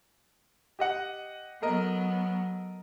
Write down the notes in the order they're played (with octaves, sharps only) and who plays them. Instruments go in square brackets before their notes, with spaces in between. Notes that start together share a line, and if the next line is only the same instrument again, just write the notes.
[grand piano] G4 D#5 F#5
[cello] F#3 B3 [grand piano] A4 A#4 D#5